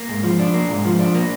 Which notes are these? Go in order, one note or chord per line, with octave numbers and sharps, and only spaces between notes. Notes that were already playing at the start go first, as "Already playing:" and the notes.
Already playing: A#3
G#2
F3
D4
A#3
G#2
F3
D4
A#3